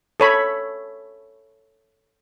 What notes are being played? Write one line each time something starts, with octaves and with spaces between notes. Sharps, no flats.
A4 C#5 B5